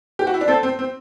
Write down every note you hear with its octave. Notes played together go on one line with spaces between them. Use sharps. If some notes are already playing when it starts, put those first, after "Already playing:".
G4
F#4
E4
D4
C4 A4
C4
C4